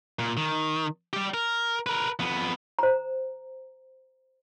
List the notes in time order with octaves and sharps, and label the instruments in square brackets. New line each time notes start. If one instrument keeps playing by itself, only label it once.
[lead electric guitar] A#2
D#3
G3 G4
A#4
A#4 B4
F2 B3
[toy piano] C5 A#5